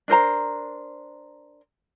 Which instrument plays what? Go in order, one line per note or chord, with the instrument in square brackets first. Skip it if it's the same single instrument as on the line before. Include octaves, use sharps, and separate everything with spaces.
[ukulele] D4 A#4 C5 A#5